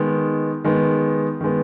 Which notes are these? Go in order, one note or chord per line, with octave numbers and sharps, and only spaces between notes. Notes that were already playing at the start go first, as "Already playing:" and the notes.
Already playing: D#3 G#3 B3
D#3 G#3 B3
D#3 G#3 B3